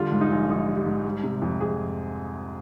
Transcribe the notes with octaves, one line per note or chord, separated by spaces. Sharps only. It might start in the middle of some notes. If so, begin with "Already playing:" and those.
Already playing: D3 G3 F4
G#2
D#4
A#1
A#1 D#4
G3
G4
G#2
G3
C3
F2
F2 G#4